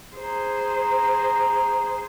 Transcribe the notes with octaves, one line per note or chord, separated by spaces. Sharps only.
G#4 C5 A#5